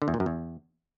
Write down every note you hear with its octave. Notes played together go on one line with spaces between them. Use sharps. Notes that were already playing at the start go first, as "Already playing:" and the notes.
D3
E2
A#2
F#2
E2